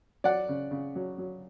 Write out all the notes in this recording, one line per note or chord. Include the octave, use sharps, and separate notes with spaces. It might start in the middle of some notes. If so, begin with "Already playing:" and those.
F#3 D5 F#5
C#3
C#3
F#3
F#3